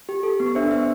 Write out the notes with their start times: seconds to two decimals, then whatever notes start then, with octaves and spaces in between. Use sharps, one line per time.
0.09 G4
0.23 A4
0.40 B3
0.55 D4 C5 E5
0.71 B3 C5 E5